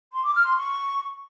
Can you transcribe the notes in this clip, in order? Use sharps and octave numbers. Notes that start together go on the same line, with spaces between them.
C6
D6
F6
C6
C#6